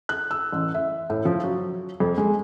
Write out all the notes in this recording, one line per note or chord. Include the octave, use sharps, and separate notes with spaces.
F#6
E6
A1
E5
A2
F3
F#3
F2
G#3